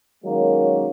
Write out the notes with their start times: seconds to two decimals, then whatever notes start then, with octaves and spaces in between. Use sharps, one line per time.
0.25 D#3 F#3 G#3 A#3 C#4